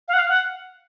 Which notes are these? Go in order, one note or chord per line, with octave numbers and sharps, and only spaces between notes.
F5
F#5
F5
F#5